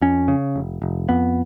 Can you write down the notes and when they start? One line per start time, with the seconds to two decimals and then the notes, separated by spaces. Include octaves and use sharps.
0.01 F2 C#4
0.28 C#3
0.56 F1
0.82 F1
1.09 F2 B3